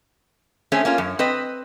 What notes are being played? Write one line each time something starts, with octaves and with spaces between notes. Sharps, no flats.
A3 C4 C#4 G#4
A#3 C#4 F4
F#2
C4 B4 D#5